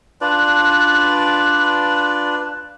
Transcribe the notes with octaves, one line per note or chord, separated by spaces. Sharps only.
D4 F4 B4 D5